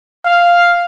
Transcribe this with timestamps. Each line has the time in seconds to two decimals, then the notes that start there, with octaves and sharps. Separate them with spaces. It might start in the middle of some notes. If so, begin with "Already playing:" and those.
0.25 F5